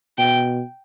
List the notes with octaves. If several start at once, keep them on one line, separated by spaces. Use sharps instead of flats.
B2 G5